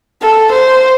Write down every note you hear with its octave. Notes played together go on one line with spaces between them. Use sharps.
A4
C5